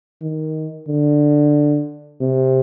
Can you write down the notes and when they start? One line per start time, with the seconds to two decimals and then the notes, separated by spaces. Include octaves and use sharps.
0.22 D#3
0.88 D3
2.21 C3